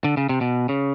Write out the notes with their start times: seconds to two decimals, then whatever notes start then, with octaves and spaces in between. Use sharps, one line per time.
0.04 D3
0.17 C#3
0.29 C3
0.41 B2
0.69 C#3